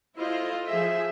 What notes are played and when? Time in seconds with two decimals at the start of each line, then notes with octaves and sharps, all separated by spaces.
0.17 E4 F4 A4 C5 D#5
0.66 F3 G#4 E5